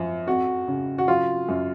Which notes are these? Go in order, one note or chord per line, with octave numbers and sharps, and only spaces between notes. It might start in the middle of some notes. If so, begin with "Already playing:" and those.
Already playing: F#2 F3
F2 F#4
C#3
F#4
F#3 F4
F#2